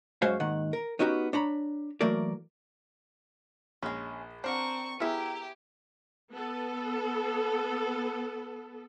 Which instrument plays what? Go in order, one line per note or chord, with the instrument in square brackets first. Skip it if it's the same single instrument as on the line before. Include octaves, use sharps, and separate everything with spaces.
[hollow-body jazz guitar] F#2 G#3 F#4 C5 C#5 F5
D#2 G#2 D#3 F#5
A#4
B3 C#4 D#4 F#4 G4
D4 C#5 A#5 B5
E3 F#3 A3 A#3 A#4 D5
[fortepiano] A#1 [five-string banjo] G#3 C#4
[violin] C4 C#6 [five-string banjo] D4 A#4 F#5 [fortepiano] C5
[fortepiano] B3 E4 G#4 [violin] G4 [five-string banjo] A#4 E5
[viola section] B3 A4